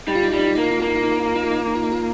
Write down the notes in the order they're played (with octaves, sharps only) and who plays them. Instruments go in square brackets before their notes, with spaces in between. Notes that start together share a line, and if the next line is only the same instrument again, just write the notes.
[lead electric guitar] G3 [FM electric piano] D#4
[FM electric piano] F4
D#4
[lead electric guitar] G3 [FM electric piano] F4
[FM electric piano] D#4
F4
[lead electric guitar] A#3 [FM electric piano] D#4
[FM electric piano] F4
D#4
[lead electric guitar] A#3 [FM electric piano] F4
[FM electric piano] D#4
F4
D#4
F4
D#4
F4
D#4
F4
D#4
F4
D#4
F4
D#4
F4